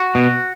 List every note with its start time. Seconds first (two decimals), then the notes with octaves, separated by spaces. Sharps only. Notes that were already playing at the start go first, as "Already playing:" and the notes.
Already playing: F#4
0.15 B2